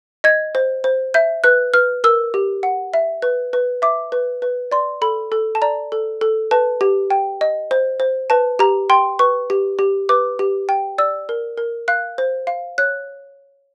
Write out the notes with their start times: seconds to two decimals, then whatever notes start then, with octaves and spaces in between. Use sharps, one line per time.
0.24 D#5 G#6
0.55 C5
0.84 C5
1.14 E5 G6
1.44 B4 F#6
1.74 B4 F6
2.04 A#4 E6
2.34 G4
2.63 F#5
2.94 E5
3.22 B4
3.53 B4
3.82 E5 D6
4.12 B4
4.42 B4
4.72 D5 C6
5.02 A4 B5
5.32 A4
5.55 A5
5.62 D5 A#5
5.92 A4
6.21 A4
6.51 B4 A5
6.81 G4
7.10 G5
7.41 D#5
7.71 C5
8.00 C5
8.30 B4 A5
8.59 G4 A#5
8.90 G5 C6
9.19 B4 C#6
9.50 G4
9.79 G4
10.09 B4 D6
10.39 G4
10.69 G5
10.98 D5 E6
11.29 A#4
11.58 A#4
11.88 F5 F#6
12.18 C5
12.47 F5
12.78 C#5 F#6